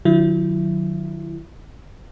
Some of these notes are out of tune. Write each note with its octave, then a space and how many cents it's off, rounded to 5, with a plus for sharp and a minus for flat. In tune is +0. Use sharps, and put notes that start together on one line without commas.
D3 +45 F#3 -30 E4 +20